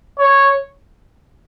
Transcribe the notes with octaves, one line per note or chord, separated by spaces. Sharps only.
C#5